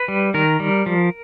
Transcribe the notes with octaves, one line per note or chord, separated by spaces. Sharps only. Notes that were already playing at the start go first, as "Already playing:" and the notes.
Already playing: B4
G3
D#3 A#4
G3
F3